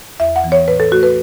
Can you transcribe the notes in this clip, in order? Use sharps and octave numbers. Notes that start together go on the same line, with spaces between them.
E2 E5
F#5
E3 B3
C#5
A2 B4
A4
A3 F#4
B4